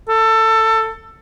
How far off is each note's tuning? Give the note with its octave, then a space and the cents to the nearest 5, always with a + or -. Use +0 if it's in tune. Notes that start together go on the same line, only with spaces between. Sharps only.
A4 +20